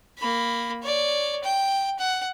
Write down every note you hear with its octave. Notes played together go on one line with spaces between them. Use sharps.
A#3 B5
C#5 D5
G5
F#5